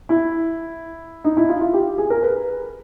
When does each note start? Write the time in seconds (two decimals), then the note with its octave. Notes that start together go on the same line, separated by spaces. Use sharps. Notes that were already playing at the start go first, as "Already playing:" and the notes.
0.09 E4
1.24 D#4
1.37 E4
1.49 F4
1.61 F4
1.73 G4
1.98 G#4
2.10 A#4
2.22 B4